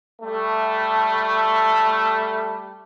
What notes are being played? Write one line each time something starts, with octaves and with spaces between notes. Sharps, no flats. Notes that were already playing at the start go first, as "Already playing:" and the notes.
G3 A3